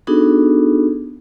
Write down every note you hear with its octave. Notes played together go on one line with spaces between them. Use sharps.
B3 D4 D#4 F#4 G#4 A4